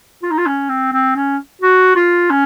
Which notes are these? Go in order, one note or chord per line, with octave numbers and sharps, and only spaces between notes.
F4
D#4
F4
C#4
C4
C4
C#4
F#4
F4
C#4